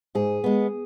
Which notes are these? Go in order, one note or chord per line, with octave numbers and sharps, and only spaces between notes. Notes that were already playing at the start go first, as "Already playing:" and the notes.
G#2 G#4
G#3 B3